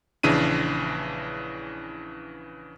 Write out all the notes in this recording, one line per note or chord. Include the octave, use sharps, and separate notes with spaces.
A#1 C#3 E3 D4 D#7